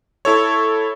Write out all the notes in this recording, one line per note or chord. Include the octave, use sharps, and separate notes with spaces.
E4 A4 C#5